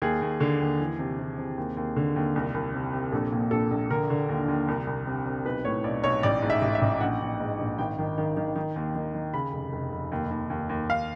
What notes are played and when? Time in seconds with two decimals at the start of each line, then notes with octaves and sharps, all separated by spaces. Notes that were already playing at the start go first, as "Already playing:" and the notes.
0.02 D#2 G#4
0.22 D#2
0.40 D3
0.60 D#2
0.80 E3
0.99 C3
1.19 C3
1.38 C3
1.57 D#2
1.77 D#2
1.96 D3
2.16 D#2
2.36 C2
2.54 C2
2.74 C3
2.93 C3
3.12 A#1 A4
3.32 A#2
3.51 A#1 A4
3.71 A#1
3.90 D3 A#4
4.10 D3
4.29 D#2
4.48 D#2
4.68 C2
4.87 C2
5.07 C3
5.26 C3
5.45 B1 B4
5.65 A2 C#5
5.84 B1 D5
6.04 B1 C#5
6.23 A1 D5
6.42 G#2
6.50 E5
6.62 A1
6.75 E5
6.82 A1
7.01 A#1 F#5
7.21 A#1
7.40 G#2
7.59 A#1
7.78 G#1 G5
7.98 D#3
8.18 D#3
8.37 D#3
8.56 D#3
8.76 D#2
8.95 D#3
9.14 D#3
9.34 C#3 B5
9.53 F1
9.73 F1
9.92 F1
10.12 D#2
10.31 D#2
10.50 D#2
10.69 D#2
10.89 D#2 F5